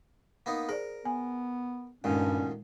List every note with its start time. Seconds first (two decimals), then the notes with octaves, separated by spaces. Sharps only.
0.46 A#3 B3 D#4
0.69 G#4 A#4 C5 D5
1.05 B3 G#5
2.04 D2 G2 A#2 D#3 G#3 C#4